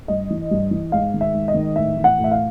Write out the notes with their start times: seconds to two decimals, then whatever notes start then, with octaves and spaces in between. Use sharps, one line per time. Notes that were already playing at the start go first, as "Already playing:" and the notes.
0.08 G2 D#5
0.30 E3
0.51 G2
0.71 E3
0.92 G#2 F5
1.14 D#3
1.21 E5
1.34 G#2
1.48 D#5
1.54 D#3
1.76 A2 E5
1.97 E3
2.04 F#5
2.18 A2
2.24 E5
2.32 F5